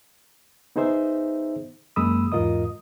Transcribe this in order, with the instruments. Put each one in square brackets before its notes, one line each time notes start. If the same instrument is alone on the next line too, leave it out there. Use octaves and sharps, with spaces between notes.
[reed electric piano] B3 D#4 G#4 C5 E5
F#2 G#3 A#3 B5 D#6 E6
E2 G#2 F4 A#4 D#5 D#6